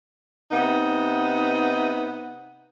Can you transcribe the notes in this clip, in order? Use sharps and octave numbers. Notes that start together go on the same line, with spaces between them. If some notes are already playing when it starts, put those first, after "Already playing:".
C3 B3 D#4